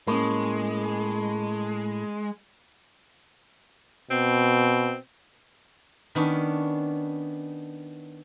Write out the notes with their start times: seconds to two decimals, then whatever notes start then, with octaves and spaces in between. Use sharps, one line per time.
0.07 A2 G#3 A#3 C#4
4.11 B2 C4
6.15 D#3 B3 C#4 D4